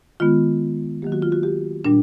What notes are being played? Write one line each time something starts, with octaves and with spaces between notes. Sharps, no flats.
D#3 G#3 B3 F4
D#3 F#3 A#3 G4
F#4
F4
F#4
G4
A#2 G3 D4